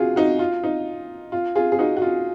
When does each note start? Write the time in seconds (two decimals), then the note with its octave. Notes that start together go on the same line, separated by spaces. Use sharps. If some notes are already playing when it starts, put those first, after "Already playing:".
Already playing: F4 F#4 G#4
0.16 D#4 F#4
0.39 F4
0.64 D#4
1.32 F4
1.55 F4 G#4
1.72 G#4
1.79 D#4 F#4
1.97 F#4
2.02 F4